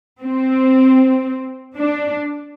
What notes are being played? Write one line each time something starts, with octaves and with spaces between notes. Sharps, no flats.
C4
D4